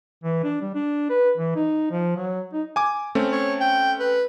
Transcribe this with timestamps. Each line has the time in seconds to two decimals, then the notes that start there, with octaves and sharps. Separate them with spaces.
0.24 E3
0.44 D4
0.61 G3
0.75 D4
1.10 B4
1.38 E3
1.56 D#4
1.91 F3
2.17 F#3
2.53 D#4
2.76 G#5 D6
3.15 A3 C4 C#4
3.32 C#5
3.60 G5
3.99 B4